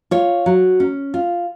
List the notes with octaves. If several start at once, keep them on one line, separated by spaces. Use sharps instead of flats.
F4 C#5
F#3
C#4
F4